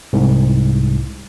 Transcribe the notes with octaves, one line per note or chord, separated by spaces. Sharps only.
C2 G#2